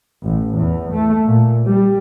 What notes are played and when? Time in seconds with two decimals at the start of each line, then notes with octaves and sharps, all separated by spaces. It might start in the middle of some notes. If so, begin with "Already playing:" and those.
0.22 A1
0.57 E2
0.92 A3
1.28 A#2
1.65 G3